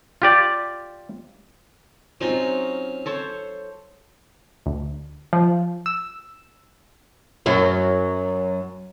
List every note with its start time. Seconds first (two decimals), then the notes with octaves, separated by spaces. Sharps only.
0.22 F4 G4 D5
2.21 F#3 C4 C#4 D#4 F4
3.06 A4 C5 C#5
4.66 D2
5.33 F3
5.86 E6
7.46 F#2 F#3